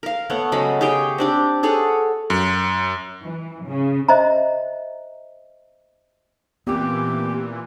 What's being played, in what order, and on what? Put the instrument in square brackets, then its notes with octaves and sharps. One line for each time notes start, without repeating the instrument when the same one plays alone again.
[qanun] A#4 F5
A3 B3 C#5 F#5
C#3 F#3 G#3 B5
G4 G#4 C#5 G5
C4 D4 G4
G#4 A4 C#5 F#5
[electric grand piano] F#2
[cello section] E3
C#3
[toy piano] C5 D#5 E5 A#5
[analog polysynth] A#2 E3 [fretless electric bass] B3 C4 [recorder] G4